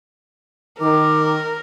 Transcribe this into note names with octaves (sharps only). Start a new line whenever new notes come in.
D#3 A#4 D6